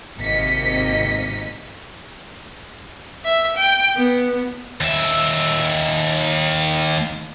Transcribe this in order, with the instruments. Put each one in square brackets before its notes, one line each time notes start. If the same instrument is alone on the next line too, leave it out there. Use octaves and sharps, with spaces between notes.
[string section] G#1 C3 A#3 D#5 B6 C#7
[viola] E5
G5
B3
[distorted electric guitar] D#2 E5